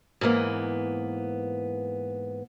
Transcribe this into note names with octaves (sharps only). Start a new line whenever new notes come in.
G#2 E3 A#3 B3